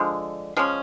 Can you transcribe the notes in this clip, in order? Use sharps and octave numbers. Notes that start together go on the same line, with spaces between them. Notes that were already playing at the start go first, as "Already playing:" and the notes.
Already playing: D3 F3 G#3
F3 G#3 C#4